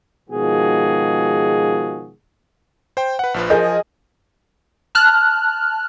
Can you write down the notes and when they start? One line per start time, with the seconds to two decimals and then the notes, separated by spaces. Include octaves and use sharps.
0.30 B2 D#3 F3 G#3 F#4 G#4
2.97 C5 G5
3.19 B4 F#5
3.34 A#1 F3 B4
3.50 F3 G#4 A#4 D#5 G6
4.95 A5 F6 F#6